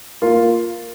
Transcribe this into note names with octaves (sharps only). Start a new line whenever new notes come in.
A#3 F4 A#4